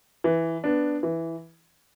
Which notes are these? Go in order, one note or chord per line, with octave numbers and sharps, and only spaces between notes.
E3
B3 D4
E3